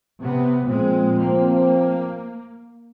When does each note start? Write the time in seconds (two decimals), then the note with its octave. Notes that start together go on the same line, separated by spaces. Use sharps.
0.22 C3 B3
0.67 A#2 F3 G#3 C4
1.19 A#3